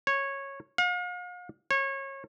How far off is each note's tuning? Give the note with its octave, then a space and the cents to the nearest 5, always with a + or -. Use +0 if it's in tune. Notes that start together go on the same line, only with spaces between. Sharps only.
C#5 -10
F5 +45
C#5 -25